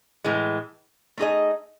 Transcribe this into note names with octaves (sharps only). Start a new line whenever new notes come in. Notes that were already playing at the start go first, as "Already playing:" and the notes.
A2 E3 G#3
A3 D#4 G#4 D#5